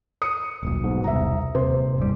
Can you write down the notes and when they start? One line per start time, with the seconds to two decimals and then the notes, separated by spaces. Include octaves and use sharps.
0.22 D#6 C#7
0.63 D#1 B1
0.84 G#2 B2
1.04 E1 C2 E5 A#5
1.55 D#1 C3 C5
1.98 D#1 G#2 G3